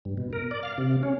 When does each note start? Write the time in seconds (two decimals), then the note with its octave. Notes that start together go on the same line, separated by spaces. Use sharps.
0.05 G2
0.17 B2
0.33 A#4
0.51 D5
0.63 F5
0.78 C3
1.03 C#4